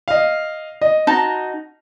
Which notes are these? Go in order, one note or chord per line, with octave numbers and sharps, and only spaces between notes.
D#5 F5
D#5
D#4 F#4 A5